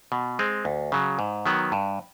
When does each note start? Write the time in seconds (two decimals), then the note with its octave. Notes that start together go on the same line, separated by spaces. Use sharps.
0.12 B2
0.39 G#3 C4
0.65 D2
0.92 C#3 F#3
1.19 G#2
1.46 D#3 F#3 B3
1.72 G2